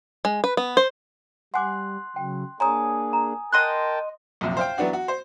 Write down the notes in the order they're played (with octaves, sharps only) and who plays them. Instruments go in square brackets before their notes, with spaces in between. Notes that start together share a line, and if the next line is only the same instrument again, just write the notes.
[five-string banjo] G#3
B4
B3
C5
[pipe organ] G3 [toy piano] F#5 G#5 D6 [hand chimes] C6 F#6
[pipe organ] C#3 F#3 [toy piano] G5
[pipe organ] A#3 D4 G#4 [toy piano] C#5 A#5 C6 [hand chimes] G#5 D#6
[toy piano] A#5
[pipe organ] A#4 G5 A5 [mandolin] D#5 C6 F#6
[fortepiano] A#1 F#2 C3
C5 F5 G5
E3 F#3 B3 D4 F#4
F#4
C5